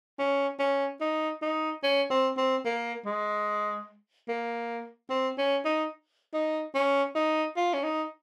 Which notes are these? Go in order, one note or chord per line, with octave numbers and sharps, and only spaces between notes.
C#4
C#4
D#4
D#4
C#4
C4
C4
A#3
G#3
A#3
C4
C#4
D#4
D#4
C#4
D#4
F4
C#4
D#4